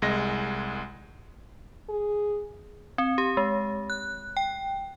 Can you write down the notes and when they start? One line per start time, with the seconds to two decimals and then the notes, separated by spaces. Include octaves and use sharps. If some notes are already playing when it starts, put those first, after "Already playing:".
0.02 C2 G#3 A#6
1.89 G#4
2.98 C4
3.18 G4
3.37 G#3
3.90 F#6
4.37 G5